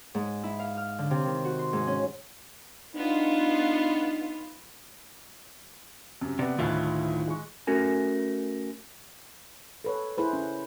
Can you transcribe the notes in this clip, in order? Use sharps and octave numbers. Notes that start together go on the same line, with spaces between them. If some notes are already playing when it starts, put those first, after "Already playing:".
G#2
E4
F5
F6
D3
C3
D#3
F#4
C6
G#2
C#4
B3 D4 D#4 F4
F#2 C3
C3 B3 D5
D2 A2 D#3 E4 F4 F#6
G#3 C#6
A3 C#4 F#4 A#4 G#5
A4 B4 C#5
E4 G#4 B4 C5
C#4